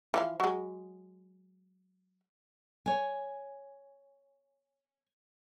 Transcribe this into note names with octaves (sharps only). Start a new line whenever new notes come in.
E3 F3 F5
F#3 G#3
C#5 G#5